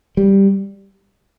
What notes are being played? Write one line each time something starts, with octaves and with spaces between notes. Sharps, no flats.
G3